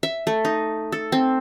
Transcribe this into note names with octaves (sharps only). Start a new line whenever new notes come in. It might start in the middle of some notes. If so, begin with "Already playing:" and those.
E5
A3
D#4
A4
C4